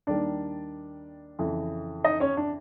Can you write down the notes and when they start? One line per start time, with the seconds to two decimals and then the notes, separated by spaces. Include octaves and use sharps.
0.07 D#2 D#3 G3 A#3 D4 D5
1.39 F2 C#3 E3
2.04 D#4 D#5
2.20 C#4 C#5
2.37 D4 D5